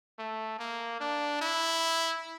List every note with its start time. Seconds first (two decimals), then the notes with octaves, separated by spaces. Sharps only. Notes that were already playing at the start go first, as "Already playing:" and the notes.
0.19 A3
0.59 A#3
1.01 D4
1.41 E4